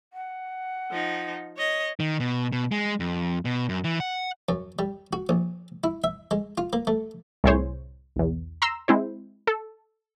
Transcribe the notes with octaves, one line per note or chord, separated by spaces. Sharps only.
F#5
F3 D#4
C#5 D#5
D#3
B2
B2
G#3
F2
B2
F#2
E3
F#5
F#2
G3
F#4
A#1
E4
E5
G#3
F4
A#3
A3
C2 A2 E4 G#4 C5 C#5
B1 E2
A#5 C6 E6
G#3 C4 E4 C5
A4